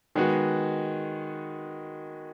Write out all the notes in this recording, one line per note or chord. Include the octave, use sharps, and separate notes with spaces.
D#3 G#3 B3 F#4